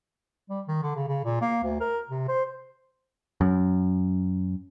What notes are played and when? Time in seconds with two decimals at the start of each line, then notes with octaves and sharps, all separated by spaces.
0.50 G3
0.68 D#3
0.83 D3
0.95 C#3
1.08 C#3
1.24 A#2
1.42 A#3
1.63 D2
1.81 A#4
2.09 C3
2.28 C5
3.41 F#2